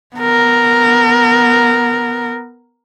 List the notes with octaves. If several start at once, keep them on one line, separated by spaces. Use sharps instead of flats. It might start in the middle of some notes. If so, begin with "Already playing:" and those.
B3 A#4